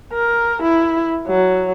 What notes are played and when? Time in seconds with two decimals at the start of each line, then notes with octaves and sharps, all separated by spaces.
0.13 A#4
0.63 E4
1.28 F#3